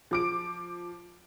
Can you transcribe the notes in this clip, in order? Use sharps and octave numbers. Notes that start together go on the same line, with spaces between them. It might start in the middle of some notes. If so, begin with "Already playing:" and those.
F3 D6 D7